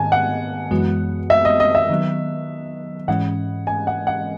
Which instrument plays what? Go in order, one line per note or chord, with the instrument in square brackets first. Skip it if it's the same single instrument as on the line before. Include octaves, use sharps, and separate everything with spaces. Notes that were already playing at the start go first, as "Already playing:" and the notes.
Already playing: [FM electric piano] G#2 D#3 B3 [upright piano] G#5 A5
[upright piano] F#5
[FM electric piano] F#2 E3 G#3 B3 F#4
[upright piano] E5
D#5
D#5
E5
[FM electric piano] D#3 F#3 B3
[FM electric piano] G#2 E3 G#3 C#4 [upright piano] F#5
[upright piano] G#5
F#5
F#5